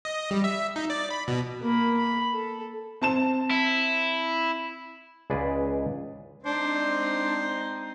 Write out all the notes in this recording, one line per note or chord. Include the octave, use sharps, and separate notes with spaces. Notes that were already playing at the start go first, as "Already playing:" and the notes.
D#5
G3
E5
D#4
D5
B5
B2
A#3 B5
B5
A4
C4 A5 E7
E4
C#2 G#4 B4 D5
G#3 C4 D4 D#4 C5